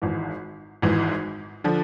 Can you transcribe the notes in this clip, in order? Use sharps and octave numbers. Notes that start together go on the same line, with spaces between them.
G#1 G#2 E3
G#1 G#2 E3
D3 F3